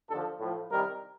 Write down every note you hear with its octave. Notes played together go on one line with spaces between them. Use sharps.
D#2 D3 F3 A4
A2 F3
C2 C3 D#3 G3 A#4